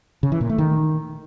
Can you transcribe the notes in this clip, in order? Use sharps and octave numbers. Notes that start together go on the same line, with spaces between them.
C#3
E3
A#2
A3
D#3